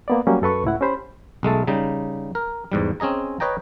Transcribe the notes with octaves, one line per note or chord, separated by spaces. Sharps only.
A#3 B3 D5
F#3 G3 A#3 C#4
F#2 A4 B4 C#6
C#2 A2 E4 F#5
C#4 G4 C5 B5
B1 G#3 A3 A4
C#3 G3 D#4
A#4
E2 G#2 G3
C4 C#4 G#4 D#5 A#5
B4 C#5 D#5 G5 A#5